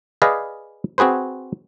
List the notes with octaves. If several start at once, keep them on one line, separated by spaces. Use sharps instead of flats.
G#4 B4 D5 D#5 F5
C4 F#4 G#4 B4 C5